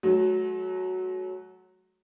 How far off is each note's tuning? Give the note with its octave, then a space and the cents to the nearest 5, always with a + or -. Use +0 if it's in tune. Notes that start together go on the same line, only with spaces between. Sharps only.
F#3 +0 A3 -45